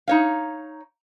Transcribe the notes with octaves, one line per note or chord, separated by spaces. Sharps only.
D#4 C#5 F5